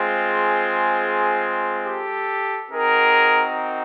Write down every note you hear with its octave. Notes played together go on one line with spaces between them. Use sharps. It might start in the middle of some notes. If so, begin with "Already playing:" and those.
Already playing: G#3 C4 F4
G#4
G4 A4
C4 D#4 F#4 G#4 A#4